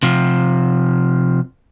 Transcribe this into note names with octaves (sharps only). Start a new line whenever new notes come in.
C3 F3